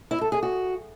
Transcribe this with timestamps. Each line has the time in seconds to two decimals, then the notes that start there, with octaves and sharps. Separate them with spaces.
0.11 E4
0.21 A4
0.32 G#4
0.43 F#4